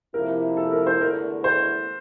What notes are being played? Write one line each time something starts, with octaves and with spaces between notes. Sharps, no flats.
C3 F3 A#3 E4 A#4
A4
A#4
C5
E2 D3 A3 E4 A#4
C5